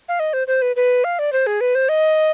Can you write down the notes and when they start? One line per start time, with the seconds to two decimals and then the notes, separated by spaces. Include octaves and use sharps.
0.08 F5
0.20 D#5
0.33 C5
0.47 C5
0.62 B4
0.76 B4
1.04 F5
1.19 D5
1.33 C5
1.47 G#4
1.61 B4
1.75 C5
1.89 D#5